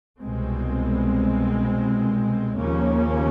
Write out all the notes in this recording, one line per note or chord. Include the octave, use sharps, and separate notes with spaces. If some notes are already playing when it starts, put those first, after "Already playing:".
C2 B2 G#3 C4
D#2 C#3 F3 A#3 C#4